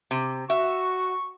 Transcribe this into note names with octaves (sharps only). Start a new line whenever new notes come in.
C3
F#4 E5 C#6